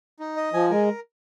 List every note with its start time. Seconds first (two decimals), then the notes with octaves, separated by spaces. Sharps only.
0.19 D#4
0.37 D#5
0.53 F3 G#5
0.70 G#3 A#4